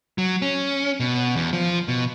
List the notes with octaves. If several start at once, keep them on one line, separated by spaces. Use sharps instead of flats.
F#3
C#4
B2
E2
F3
B2